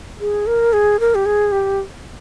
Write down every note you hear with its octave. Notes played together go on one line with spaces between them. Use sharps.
G#4
A#4
G#4
A#4
G4
G#4
G4